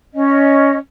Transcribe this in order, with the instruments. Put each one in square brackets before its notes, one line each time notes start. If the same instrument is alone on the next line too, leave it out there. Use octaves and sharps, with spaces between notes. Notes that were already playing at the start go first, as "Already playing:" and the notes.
[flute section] C#4 D#5